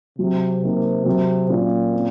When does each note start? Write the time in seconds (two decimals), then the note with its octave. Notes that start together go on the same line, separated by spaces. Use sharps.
0.19 C3 F#3
0.63 C3 A#3 D#4 A#4
1.06 C3 F#3
1.49 A#2 C#4 F4
1.93 C4